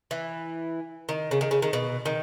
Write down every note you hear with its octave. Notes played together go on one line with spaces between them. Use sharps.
E3
D#3
C#3
D#3
C#3
D#3
B2
D#3